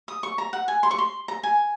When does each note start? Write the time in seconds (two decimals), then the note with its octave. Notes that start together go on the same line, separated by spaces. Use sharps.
0.08 D#6
0.23 C#6
0.38 A#5
0.53 F#5
0.68 G#5
0.83 C6
0.91 C#6
0.98 C6
1.28 A#5
1.43 G#5